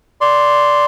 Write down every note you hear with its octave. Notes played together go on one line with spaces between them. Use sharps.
D5 C6